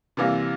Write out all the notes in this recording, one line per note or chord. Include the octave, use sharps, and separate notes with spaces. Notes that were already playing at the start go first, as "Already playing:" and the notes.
C3 E3 G3 A#3